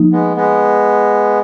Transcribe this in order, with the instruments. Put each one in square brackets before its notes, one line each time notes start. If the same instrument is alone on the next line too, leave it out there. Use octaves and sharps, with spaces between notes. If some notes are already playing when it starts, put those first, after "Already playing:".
Already playing: [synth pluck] F3 A#3 D#4
[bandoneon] G#3 B3
G#3 B3